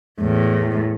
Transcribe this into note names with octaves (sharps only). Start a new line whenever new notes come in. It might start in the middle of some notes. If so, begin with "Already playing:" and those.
E2 A2